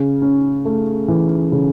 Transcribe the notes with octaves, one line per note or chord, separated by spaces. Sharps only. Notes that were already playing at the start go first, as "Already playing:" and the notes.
Already playing: C#3
C#4
A3
E3
C#3